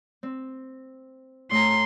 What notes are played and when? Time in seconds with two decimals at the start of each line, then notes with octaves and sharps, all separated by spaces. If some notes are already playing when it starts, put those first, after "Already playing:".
0.23 C4
1.51 A2 A#5 C6